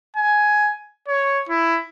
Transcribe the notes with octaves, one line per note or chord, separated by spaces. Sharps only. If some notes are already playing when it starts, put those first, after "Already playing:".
G#5
C#5
E4